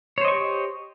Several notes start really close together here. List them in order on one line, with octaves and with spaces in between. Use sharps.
C#5 C5 D#5 C#6 G4